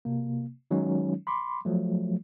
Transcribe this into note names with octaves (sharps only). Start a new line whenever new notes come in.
C3 A#3
D#3 F#3 G#3 C#4 D#4
B5 C6 D6
F3 F#3 A3